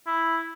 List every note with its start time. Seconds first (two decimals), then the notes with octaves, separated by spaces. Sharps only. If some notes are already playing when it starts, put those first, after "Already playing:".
0.07 E4